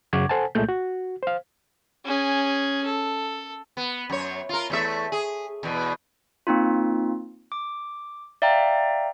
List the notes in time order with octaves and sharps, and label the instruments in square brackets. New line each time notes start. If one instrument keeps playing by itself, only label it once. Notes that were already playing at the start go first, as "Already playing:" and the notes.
[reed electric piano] F#2 C#3 F#5 C#6 D6 G#6
A4 C5 F#5 G#5 A5
C2 A#2 G#3 A3 G6
F#4
C5 F5
[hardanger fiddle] C#4 G#4
A4
[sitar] B3
F#2 C#5
F4 A#4
E2 A3 E5
G#4
E2 B2
[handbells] A#3 C4 D#4 F4
D6
D5 E5 F5 G5 A#5